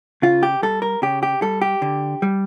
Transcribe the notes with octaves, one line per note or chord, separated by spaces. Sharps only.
C#3 F4
G4
G3 A4
A#4
C#3 G4
G4
G3 A4
G4
D3
G3